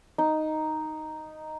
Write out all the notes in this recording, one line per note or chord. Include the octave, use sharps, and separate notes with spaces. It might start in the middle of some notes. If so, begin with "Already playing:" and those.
D#4